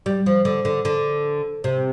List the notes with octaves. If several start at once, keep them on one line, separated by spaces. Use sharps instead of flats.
G3
F3
D3
D3
D3
C3